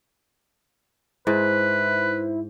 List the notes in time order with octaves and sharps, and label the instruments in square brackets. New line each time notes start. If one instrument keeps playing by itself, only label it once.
[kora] G#2 [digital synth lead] E4 [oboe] B4 [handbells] C5